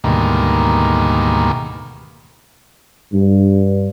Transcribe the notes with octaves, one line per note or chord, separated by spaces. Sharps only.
D2 G#2 B2 D#3 G3 A#3
G2